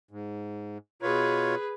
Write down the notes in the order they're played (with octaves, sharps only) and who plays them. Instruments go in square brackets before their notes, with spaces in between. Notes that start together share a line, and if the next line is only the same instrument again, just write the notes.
[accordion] G#2
[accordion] B2 F4 C#5 [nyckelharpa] G#4 B4